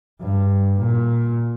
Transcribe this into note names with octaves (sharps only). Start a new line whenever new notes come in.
G2
A#2